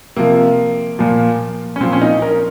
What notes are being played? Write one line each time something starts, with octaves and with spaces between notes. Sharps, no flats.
C3 F3 A#3
A#2 F3
C#4
A#2 F3 C4
C#4
D#4
A#4